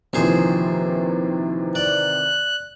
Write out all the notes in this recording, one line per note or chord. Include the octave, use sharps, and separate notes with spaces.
A#1 C3 D#3 E3 G#4 C5
D5 F#6